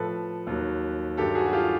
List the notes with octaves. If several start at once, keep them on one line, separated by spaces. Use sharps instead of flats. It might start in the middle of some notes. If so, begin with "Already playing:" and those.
Already playing: A2 F3 A4 B4
D#2 D#3 F#3
G2 D#3 F#3 G4 A4
F#4 G#4
F#4
F4 G4